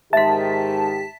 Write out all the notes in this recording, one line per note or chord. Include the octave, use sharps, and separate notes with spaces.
G#2 D#3 G4 E5 A5 C6 B6